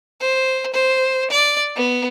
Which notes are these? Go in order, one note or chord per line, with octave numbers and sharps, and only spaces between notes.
C5
C5
D5
B3